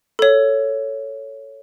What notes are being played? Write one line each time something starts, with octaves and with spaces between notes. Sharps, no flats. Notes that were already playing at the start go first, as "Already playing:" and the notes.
A4 C#5